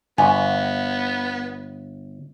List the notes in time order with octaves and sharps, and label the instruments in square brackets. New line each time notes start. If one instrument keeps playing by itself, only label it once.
[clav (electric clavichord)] G1 [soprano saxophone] B3 [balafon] G#5